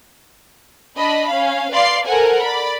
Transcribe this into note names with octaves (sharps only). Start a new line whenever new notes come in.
D4 D#5 B5
C#4 F5
B4 D5 F5 C6 C7
A4 A#4 C5 F#5 G#5
D5 B5